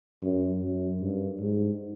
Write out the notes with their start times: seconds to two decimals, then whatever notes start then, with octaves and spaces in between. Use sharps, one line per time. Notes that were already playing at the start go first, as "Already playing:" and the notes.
0.23 F#2
0.62 F#2
1.01 G2
1.41 G#2